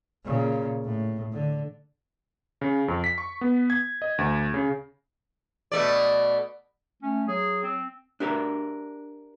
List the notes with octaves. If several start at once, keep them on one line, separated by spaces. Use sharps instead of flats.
A#2 C#3
A2
D3
C#3
F2
B6
C#6
B3
G#6
D#5
D2
C#3
B2 A3 D5
A3 C#4
F#3 G#4
C4
D4 G4 A#4 E5